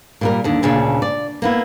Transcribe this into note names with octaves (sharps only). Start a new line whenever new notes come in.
A#2 G3 A#4
D#2 D3
D2 A#2 C#3 D4 E5
D5
A#3 B3 E4